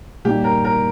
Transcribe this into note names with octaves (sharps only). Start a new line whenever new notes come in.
A#2 G3 A#3 D#4 G4
A#4
A#4